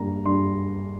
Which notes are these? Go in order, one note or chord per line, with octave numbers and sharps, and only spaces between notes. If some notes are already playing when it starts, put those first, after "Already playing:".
Already playing: G2 A#3 A#5
G2 C6